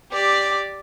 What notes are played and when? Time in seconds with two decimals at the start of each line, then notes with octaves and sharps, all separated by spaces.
0.12 G4 D5